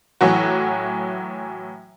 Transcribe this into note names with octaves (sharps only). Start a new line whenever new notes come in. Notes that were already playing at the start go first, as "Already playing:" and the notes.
A2 E3 F#3 F#4